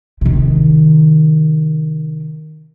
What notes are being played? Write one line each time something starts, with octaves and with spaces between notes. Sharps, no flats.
C3 D#3